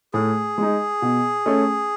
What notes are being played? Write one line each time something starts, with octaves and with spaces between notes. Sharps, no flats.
A2 G#4
G#3 D#4
B2
A3 C#4